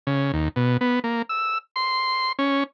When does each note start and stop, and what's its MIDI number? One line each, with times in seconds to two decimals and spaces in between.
0.07 0.32 49
0.33 0.49 39
0.56 0.77 47
0.81 0.99 59
1.04 1.22 58
1.29 1.58 88
1.76 2.32 84
2.39 2.64 61